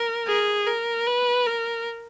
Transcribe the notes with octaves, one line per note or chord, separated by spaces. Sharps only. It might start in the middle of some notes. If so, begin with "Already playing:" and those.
Already playing: A#4
G#4
A#4
B4
A#4